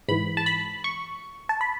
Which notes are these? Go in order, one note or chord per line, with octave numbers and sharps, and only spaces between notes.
G#2 E3 B5
A5
B5
C#6
A5
B5